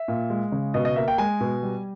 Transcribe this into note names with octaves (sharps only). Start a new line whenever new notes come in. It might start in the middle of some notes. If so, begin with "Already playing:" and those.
Already playing: E5
A#2
G#3
C#3
B2 D#5
D#5
A#3 E5
G5
G#3 G#5
B2
G3